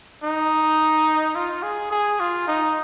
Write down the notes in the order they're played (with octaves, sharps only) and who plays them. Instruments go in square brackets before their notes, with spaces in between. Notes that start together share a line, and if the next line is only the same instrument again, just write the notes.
[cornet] D#4
F4
G#4
G#4
F4
D#4